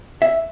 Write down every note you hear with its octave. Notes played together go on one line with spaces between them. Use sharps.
E5